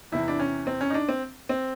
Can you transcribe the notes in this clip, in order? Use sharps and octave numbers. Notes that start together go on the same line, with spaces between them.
E2 C3 E3 E4
D4
C#4
C4
C#4
D#4
D4
C4
C4